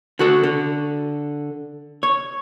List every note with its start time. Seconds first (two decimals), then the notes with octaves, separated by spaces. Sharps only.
0.19 D3 F#4 A4
0.44 D3
2.03 C#5